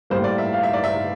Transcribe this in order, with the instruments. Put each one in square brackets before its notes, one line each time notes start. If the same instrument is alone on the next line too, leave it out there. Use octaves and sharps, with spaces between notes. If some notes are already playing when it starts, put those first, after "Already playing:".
[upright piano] A2 G3 A#3 C5
D5
E5
F5
E5
D5
E5